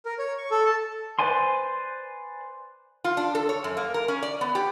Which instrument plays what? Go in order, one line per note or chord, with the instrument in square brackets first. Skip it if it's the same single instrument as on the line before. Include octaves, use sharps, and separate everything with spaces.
[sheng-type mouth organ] A#4
C#5
C#6
A4
A5
[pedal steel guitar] B4 C5 D5 G#5 C6
[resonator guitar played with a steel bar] F4
D4
A4
C#5
F#2
A#3
A#4
C#4
D5
B3
G4